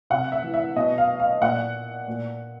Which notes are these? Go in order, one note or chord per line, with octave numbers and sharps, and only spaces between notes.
C3 F#5
E5
E3
E5
B2 D#5
F5
F5
A#2 F#5
A#2